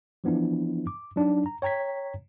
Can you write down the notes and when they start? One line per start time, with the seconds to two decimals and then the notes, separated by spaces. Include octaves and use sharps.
0.24 E3 F3 B3 D4 E4
0.87 D6
1.16 F#3 D4 D#4
1.46 A#5
1.62 C#5 G5 A#5 G#6 B6